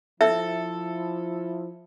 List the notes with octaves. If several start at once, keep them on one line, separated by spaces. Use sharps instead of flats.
F3 E4 A4 E5